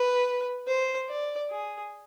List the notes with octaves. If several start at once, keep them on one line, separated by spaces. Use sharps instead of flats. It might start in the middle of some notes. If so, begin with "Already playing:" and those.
Already playing: B4
C5
D5
G#4